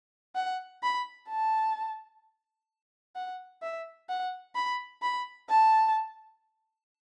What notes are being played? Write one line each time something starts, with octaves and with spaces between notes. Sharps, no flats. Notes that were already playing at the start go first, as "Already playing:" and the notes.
F#5
B5
A5
F#5
E5
F#5
B5
B5
A5